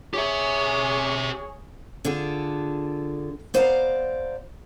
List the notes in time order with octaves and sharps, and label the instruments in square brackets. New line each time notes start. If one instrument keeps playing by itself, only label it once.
[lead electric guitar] G4 E5 [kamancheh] G#4 C#5
[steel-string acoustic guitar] D3 D4 F4 G#4 A4
B3 C5 D5 F5 G#5 A#5